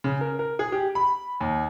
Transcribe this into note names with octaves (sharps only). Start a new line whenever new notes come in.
C#3
A#4
A#4
G#4
G4
B5
D#2